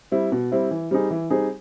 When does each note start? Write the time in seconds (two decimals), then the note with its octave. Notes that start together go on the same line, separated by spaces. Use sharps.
0.12 G3 C4 E4
0.32 B2
0.52 G3 C4 E4
0.71 E3
0.91 G3 C4 D#4 G#4
1.11 E3
1.30 G3 C4 D#4 G#4